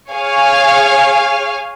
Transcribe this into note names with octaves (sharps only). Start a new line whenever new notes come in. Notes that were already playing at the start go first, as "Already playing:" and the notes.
G#4 C#5 F5 G#5